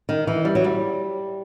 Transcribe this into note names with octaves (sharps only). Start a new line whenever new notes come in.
D#3
E3
G3
F#3
G3